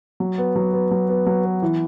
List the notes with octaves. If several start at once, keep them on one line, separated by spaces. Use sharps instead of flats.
F#3
B3
F#3
B3
F#3
B3
F#3
B3
E3